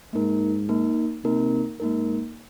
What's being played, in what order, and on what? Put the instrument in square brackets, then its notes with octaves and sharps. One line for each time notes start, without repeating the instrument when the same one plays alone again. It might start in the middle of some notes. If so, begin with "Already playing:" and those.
[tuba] G#2 [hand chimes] A#3 D#4 A#4
[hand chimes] A#3 D#4 A#4
[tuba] C3 [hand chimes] A#3 D#4 A#4
[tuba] G#2 [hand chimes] A#3 D#4 A#4